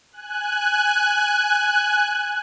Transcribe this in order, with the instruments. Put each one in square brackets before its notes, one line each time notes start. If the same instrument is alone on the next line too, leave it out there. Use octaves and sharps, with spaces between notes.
[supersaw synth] G#5 F#6